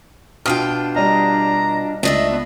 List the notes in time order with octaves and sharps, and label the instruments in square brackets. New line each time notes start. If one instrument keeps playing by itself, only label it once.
[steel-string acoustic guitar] B2 F4 G5 [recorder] D4 [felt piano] D#6 F6
[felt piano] G3 D5 D#5 [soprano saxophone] A#5
[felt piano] C#2 [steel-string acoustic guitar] A3 D4 E5 [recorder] D#5
[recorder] B3